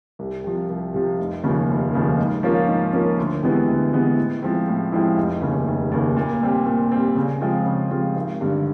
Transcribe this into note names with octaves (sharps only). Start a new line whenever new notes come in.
C2
C3 F3
C2
C3 F3
F1
D#2 C#3 F3
F1
D#2 C#3 F3
G#2
F3 A#3 C#4 F4
G#2
F3 A#3 C#4 F4
D2
C3 E3 G#3 B3
D2
C3 E3 G#3 B3
A2
F3 G#3 C4 E4
A2
F3 G#3 C4 E4
F1
D#2 C#3
F1
D#2 C#3
A#2
G3 C4
A#2
G3 C4
C#3
F3 G#3 C4 F4
C#3
F3 G#3 C4 F4
G#1
G2 D3